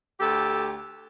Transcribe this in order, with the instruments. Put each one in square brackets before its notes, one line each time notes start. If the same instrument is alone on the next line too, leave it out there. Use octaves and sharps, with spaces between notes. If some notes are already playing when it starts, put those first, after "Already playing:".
[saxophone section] D2 G4 A4